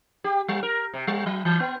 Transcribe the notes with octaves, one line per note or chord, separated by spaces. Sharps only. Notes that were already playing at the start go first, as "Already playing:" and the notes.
G4
G3
A#4
C3
G3
F#3
E3
B3